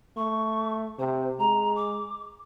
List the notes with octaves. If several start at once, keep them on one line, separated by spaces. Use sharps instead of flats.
A3 C#6
C3 C5
G#3 A#5
D6